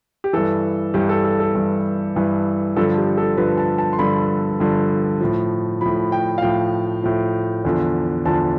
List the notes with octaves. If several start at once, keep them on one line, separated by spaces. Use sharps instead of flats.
G4
G2 E3 A4
G2 E3 G4
A4
A4
A4
G2 E3
G2 E3
G2 D3 F3 A4
G4
A4
G2 D3 F3 B4
A5
A5
C6
G2 D3 F3 B5
G2 D3 F3
A2 F3
A2 F3 B5
G5
F5
A2 F3 G5
A2 F3
E2 D3 F3
E2 D3 F3 A5